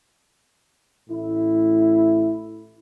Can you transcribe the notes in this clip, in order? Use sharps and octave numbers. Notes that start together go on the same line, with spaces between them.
A1 A2 E4